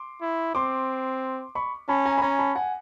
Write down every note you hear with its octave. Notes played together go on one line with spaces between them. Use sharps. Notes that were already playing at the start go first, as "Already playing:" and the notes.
Already playing: C6 D6
E4
C4 C6 D6
B5 C#6
C#4 A5 B5
G#5 A#5
B5
C#4 G#5 A#5
A5 B5
F#5 G#5